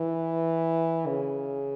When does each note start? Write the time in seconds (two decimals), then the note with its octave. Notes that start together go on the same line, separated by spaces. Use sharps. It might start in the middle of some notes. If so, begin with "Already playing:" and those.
Already playing: E3
1.07 C#3